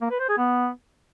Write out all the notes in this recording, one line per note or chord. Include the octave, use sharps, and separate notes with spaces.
A#3
B4
C5
G#4
B3